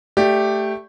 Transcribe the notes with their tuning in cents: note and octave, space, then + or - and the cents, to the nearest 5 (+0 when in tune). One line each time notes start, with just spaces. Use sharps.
A3 +0 G4 +0 D5 +0